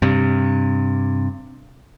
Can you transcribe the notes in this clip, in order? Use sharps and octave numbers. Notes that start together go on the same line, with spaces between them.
G2 C3